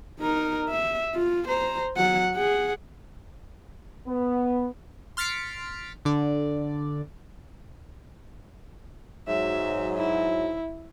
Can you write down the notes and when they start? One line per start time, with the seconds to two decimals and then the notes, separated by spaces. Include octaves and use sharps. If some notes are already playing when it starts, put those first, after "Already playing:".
0.20 D#4 A#4
0.69 E5
1.15 F4
1.48 C5 A#5
1.97 F#3 F#5
2.35 G#4 F#5
4.07 B3
5.17 C6 F6 A6 B6 C#7 D7
6.05 D3 D5
9.28 G#2 F#3 E5
9.96 E4